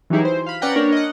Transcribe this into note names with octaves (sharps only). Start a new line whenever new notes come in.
E3 F#3 G3 D#4 E4 G#4
C5
F5 B5
C#4 B4 D5 F#5 G5 A#5
A#3 D4 A#4 C#5
D#5 F#5